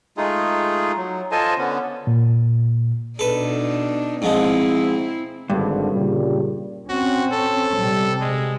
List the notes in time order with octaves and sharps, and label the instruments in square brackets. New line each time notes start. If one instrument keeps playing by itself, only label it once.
[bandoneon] G#3 A3 D#4 F4 G#4
F#3
F4 A4 C5 D#5 G#5 A5
D3 B3 C#4
[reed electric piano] A#2
[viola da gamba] B2 D4 D#4 [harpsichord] A4 B4
[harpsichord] G#2 F3 G#3 [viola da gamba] C4 E4
[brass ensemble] G#1 D3 [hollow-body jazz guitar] G2
[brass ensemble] A#2 C#3 G3
[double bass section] C4 C#4 [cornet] F#4
[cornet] A4
[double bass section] C3 G3
[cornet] G#3